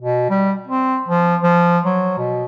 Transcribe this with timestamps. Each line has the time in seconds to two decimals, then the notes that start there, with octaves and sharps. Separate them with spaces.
0.01 B2
0.30 G3
0.67 C4
1.08 F3
1.43 F3
1.85 F#3
2.18 B2